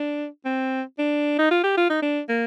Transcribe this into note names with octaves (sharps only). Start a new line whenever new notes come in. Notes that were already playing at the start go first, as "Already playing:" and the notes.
Already playing: D4
C4
D4
D#4
F4
G4
F4
D#4
D4
A#3